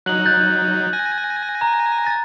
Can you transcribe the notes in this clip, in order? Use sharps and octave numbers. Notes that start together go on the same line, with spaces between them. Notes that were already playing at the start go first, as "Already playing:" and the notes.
F#3 D#4 F#6 F#7
F#6 G6 A6
G#5 A#6
A#5
A6